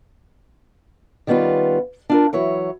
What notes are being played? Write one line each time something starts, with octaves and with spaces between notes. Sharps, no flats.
D#3 G3 B3 C#4 F4
D4 F4 A#4
E3 F#3 E4 C#5